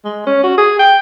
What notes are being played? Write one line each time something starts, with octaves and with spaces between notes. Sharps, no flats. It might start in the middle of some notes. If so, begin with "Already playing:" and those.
G#3
C#4
F#4
G#4
G5